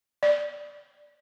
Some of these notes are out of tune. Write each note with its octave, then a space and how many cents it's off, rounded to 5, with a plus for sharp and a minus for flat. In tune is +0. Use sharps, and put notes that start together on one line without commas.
D5 +0